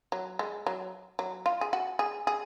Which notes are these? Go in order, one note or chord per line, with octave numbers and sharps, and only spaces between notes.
F#3
G#3
F#3
F#3
F4
G#4
F#4
G#4
G#4